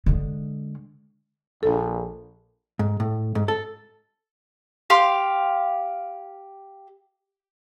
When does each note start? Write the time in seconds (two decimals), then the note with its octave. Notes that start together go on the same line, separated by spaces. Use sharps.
0.06 D3 G#3
1.63 A#1 A4
2.79 G#2
3.00 A2
3.35 G#2
3.48 A4
4.90 G4 F5 C6